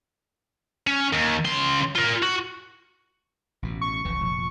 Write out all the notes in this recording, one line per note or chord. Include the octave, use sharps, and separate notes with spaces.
C#4
D#2
C#3 C6
F4 A#4
F#4
A1 B2
C#6
F1 C2 E3
F1 A#2 F3